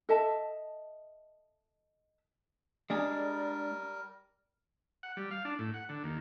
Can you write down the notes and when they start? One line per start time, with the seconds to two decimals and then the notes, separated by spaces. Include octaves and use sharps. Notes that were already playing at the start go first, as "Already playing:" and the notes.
0.09 A4 D#5 E5 A5
2.90 G3 G#3 D4 G#4 A#4
5.03 F#5
5.17 G3
5.31 F5
5.45 D4
5.59 A2
5.74 F#5
5.89 D3
6.04 D#2